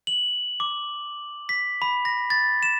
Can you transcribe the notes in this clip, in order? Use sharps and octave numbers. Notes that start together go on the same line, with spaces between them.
F#7
D6
B6
B5
A#6
A6
E7